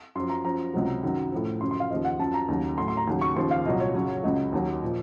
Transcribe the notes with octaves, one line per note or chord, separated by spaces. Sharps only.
F#2 F3 C6
A#5
F#2 F3 A#5
C#2 C3 F#3
F#2 D#3 F#3
A2 F3
F#2 C#3 F3 C6
C6
F5
D#2 C#3 F3 D#5
F#5
F#2 F3 A5
A#5
D#2 C#3 F#3
A2 F#3 C6
C6
A#5
D#2 C#3 F#3
C#6
D#2 C#3 F3 C6
F5
C2 A#2 F#3 D#5
C#5
F#2 C#3 F#3
C#2 C#3 F#3 D#5
D#2 D#3 F#3
A#2 F3